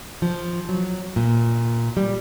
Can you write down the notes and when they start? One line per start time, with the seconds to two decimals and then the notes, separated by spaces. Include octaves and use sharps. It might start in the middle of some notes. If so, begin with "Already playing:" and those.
0.22 F3
0.69 F#3
1.16 A#2
1.97 G3